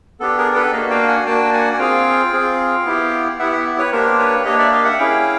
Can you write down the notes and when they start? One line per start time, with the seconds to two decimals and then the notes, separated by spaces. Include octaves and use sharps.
0.20 B3 D4 G4 A4
0.38 G#4 A#4
0.55 A4 B4
0.73 A#3 D4 F#4 D#5 F5
0.90 F5 G5
1.08 F#5 G#5
1.26 A#3 D4 F#4 G5 A5
1.53 F#5 G#5
1.74 G#5
1.79 C4 F4 G#4 F5 G5
2.33 C4 F4 G#4
2.85 B3 E4 G4
3.39 B3 E4 G4 E5 F#5
3.52 E5 F#5
3.78 B4 C#5
3.92 A#3 D4 G4 A#4 C5
4.19 B4 C#5
4.45 A#3 D4 G4 C#5 D#5
4.59 D5 E5
4.72 D#5 F5
4.85 E5 F#5
4.98 C#4 E4 G#4 F5 G5